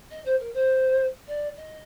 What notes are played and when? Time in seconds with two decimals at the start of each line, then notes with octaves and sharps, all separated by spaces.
0.11 D#5
0.25 C5
0.40 A#4
0.54 C5
1.27 D5
1.57 D#5